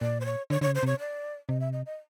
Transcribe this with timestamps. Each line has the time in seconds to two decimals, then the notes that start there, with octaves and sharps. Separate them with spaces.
0.01 A#2 D5
0.21 C5
0.26 C#5
0.50 D3 C#5
0.61 D3 C#5
0.67 C#3
0.75 C5
0.83 C3 C#5
0.99 D5
1.49 C3 D#5
1.60 E5
1.73 D#5
1.86 D#5